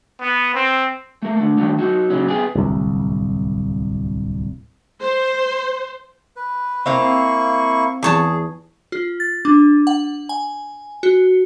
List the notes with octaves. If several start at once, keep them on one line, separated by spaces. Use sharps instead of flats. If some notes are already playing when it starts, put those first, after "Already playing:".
B3
C4
A3 A#4
D3 A3
D3 D#3 F#3 G3 A3
F#3 D#4 F#4
A#2 C#3 F#3 C#4
B3 G4 G#4
D1 C2
C5
B4
A#3 C4 E4 F5 A#5 C#6
E2 G#4 C#5 A5
F4
A6
D4
F#5
G#5
F#4